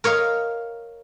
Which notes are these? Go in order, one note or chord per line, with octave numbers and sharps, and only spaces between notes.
A#4 C#5 D#5 F5